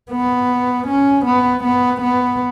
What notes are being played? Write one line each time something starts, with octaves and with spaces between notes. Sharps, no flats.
B3
C#4
B3
B3
B3